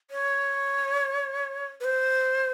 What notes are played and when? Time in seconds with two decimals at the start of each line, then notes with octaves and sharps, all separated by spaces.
0.11 C#5
1.80 B4
1.84 C5